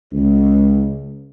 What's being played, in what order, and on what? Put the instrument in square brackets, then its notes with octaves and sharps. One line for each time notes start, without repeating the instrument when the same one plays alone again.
[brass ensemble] C#2